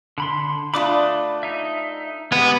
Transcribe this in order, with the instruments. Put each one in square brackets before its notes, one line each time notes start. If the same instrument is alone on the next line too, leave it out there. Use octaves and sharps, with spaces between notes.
[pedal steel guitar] D3 B5 C6
[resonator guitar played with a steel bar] A3 D4 F4 [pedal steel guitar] B5 D6 D#6
[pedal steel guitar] D#4 E5
[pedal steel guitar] G#3 G4 [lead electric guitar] B3 B4